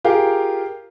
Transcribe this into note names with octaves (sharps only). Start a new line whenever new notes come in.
F4 G4 G#4 A#4 F5